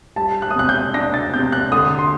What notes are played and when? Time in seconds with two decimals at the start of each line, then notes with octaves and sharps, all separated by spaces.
0.16 G3 A5
0.42 F#6
0.51 D#6
0.55 C3 F#6
0.69 G6
0.94 D4 A#6
1.14 A6
1.34 C3 G6
1.52 F#6
1.72 D3 D#6
1.99 C6